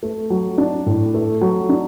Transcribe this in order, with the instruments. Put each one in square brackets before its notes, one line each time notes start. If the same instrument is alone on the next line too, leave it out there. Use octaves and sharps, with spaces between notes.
[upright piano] A3
F#3
D4
A2
A3
F#3
D4